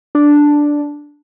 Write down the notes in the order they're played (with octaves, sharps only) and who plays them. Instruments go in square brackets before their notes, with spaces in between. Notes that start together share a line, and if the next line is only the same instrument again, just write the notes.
[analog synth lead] D4